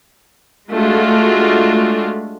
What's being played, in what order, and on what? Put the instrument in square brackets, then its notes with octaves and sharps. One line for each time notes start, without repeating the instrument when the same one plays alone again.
[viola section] G#3 A3 D4 F4 F#4